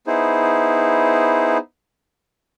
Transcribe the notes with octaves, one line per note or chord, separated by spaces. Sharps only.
B3 D#4 E4 G#4 C5